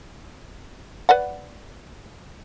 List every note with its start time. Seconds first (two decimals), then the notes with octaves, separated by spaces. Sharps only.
1.09 B4 D5 F#5